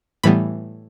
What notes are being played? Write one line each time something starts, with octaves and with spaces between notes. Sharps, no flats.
A2 E3 G3 B3 B5